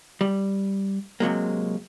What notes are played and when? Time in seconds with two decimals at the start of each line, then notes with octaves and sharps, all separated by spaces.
0.21 G3
1.20 C3 F#3 G#3 A#3